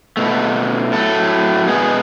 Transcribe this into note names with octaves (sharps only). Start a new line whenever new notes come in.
B2 A3
A2 F#3 A3 A4
B2 G#3 B3 G#4